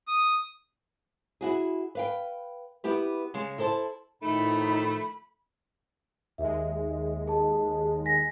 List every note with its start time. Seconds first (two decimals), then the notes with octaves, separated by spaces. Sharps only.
0.08 D#6
1.41 E4 F#4 G#4
1.95 B4 F5 G5
2.84 B3 E4 G4 B4
3.34 C#3 G#3
3.58 E4 A4 C5 A5
4.22 A2 D#3 F3 A3 D#4 B5
6.38 D#2 G#3 E5
7.28 G#4 A5
8.06 G#5 A#6 B6